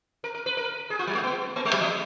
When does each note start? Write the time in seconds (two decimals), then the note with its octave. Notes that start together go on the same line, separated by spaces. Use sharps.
0.24 A#4
0.35 A#4
0.46 B4
0.57 A#4
0.90 G#4
0.99 F4
1.07 F#3
1.15 G#3
1.24 B3
1.56 A#3
1.65 G#3
1.73 F#3
1.81 F3